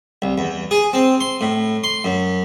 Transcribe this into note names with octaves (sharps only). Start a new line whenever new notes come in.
C2
E2
G#4
C4
C6
A2
C6
F#2